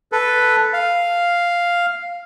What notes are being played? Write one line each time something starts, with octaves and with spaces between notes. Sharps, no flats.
A4 B4
F5